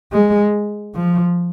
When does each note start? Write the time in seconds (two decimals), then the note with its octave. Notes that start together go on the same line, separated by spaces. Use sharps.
0.12 G#3
0.94 F3